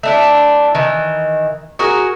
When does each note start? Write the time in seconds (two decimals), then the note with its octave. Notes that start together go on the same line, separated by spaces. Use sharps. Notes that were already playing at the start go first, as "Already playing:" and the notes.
0.03 A3 D4 E4
0.75 D#3 E3
1.79 F#4 G#4 A#4